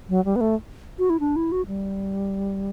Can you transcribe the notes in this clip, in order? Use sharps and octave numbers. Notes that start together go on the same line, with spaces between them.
F#3
G3
B3
A3
F#4
E4
D4
E4
F#4
G3